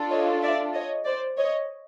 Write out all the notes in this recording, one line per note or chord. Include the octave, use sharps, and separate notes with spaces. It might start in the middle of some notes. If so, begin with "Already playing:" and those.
Already playing: D4 F4 A4
C#5 D#5
D5 E5
C#5 D#5
C5 D5
C#5 D#5